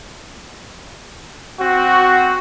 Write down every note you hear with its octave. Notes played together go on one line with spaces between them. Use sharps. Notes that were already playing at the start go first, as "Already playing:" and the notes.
C4 F#4